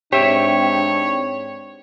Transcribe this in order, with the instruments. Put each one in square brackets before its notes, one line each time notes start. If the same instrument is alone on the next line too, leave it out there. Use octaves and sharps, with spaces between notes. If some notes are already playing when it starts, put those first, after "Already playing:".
[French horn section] G#2 C4 D4 [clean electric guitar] G4 E5 [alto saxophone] C#5